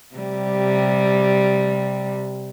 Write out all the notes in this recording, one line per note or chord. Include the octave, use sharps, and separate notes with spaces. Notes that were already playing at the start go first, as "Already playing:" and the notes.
C3 G3